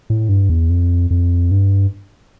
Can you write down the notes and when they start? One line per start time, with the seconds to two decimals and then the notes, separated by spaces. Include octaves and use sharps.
0.10 A2
0.29 G2
0.50 E2
0.70 F2
1.10 F2
1.51 G2